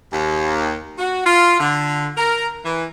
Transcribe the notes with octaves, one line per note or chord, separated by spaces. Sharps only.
D#2
F#4
F4
D3
A#4
E3